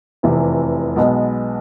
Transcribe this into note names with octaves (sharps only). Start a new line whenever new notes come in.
F1 E2 C3 E3
B1 B2 G#3 B3